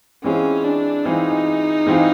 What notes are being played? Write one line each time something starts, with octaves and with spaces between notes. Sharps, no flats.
E3 G#3 C4 C#4 F4 G#4
D4
E3 G#3 C4 D#4 F4 G#4
E3 G#3 C4 F4 G#4